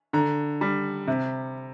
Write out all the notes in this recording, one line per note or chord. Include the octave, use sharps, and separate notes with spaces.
D3 A#5
G3
C3